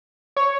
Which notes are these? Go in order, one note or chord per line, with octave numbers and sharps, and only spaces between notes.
C#5